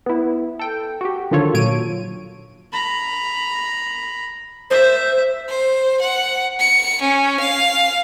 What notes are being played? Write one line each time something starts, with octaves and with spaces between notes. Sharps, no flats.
B3 E4
A4 G5
F#4 G4
D3 D#3 F3 F4 A4 C#5
A#2 F#3 C#5 D7 D#7
A#5 B5
C5 E5
C5
F#5
C#7
C#4
F5